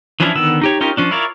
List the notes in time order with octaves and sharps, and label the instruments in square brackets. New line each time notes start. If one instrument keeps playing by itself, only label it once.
[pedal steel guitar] E3 F3 C#4 D4 E4
D3 D#3 B3 E6
D#4 G4 C#5
C#4 D#4 F4 G4 A#4
F3 C#4 D4
E4 F4 A#4 C#5 D5